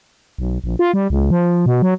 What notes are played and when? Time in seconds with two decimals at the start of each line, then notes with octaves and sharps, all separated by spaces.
0.38 B1
0.64 A#1
0.79 F4
0.94 G3
1.10 C#2
1.31 F3
1.66 B2
1.82 F#3